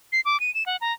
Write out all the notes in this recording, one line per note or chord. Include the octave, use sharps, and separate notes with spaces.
C7
D6
D#7
E7
F#5
A#5